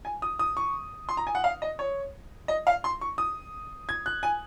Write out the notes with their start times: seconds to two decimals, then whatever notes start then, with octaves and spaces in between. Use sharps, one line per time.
0.05 G#5
0.22 D#6
0.39 D#6
0.57 C#6
1.09 C6
1.17 A#5
1.27 G#5
1.35 F#5
1.44 F5
1.62 D#5
1.79 C#5
2.48 D#5
2.67 F5
2.84 C6
3.01 C#6
3.18 D#6
3.89 G#6
4.06 F#6
4.23 G#5